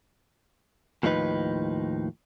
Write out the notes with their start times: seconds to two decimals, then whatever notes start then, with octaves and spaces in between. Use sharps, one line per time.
1.03 D#2 A2 F3 D#4 B4